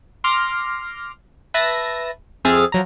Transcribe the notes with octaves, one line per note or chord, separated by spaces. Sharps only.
C6 D6 F6 A#6
B4 E5 A5 A#6
F2 C4 G#4 E5 F6 A6
F3 F#3 A#5